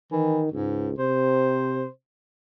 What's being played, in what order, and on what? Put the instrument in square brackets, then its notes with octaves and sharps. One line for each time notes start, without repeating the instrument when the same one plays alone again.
[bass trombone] D#3 [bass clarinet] E3
[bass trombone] C#2 [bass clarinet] G#2
[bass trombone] C3 [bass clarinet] C5